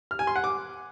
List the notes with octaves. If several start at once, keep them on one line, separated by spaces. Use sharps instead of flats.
F6
G#5
C6
F#5
D6